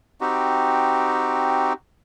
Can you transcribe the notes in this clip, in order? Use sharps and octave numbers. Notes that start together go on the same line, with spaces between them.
C4 D#4 F#4 G4